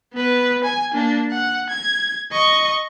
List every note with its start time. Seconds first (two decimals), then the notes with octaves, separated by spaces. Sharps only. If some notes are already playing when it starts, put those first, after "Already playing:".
0.13 B3 B4
0.64 G#5
0.94 A#3 D4
1.31 F#5
1.70 G#6
2.32 D#5 C#6